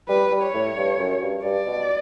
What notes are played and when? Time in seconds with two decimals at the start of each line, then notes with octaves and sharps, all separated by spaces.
0.08 G3 B4
0.31 G3
0.43 C#5
0.54 A2
0.77 G2
0.99 F#2
1.22 G2
1.44 G2 D5
1.66 B2